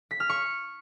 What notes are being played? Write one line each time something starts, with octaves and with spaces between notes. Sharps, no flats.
B6
F6
C#6